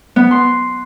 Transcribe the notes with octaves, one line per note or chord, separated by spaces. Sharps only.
B3
C6